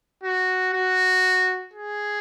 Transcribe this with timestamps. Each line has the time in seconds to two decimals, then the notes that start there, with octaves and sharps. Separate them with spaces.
0.24 F#4
0.73 F#4
1.74 G#4